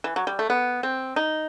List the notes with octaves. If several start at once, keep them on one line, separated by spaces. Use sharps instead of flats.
E3
F#3
G3
A3
B3
C4
D#4